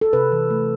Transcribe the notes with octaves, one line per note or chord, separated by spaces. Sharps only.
A4
C3 B4
E3
A3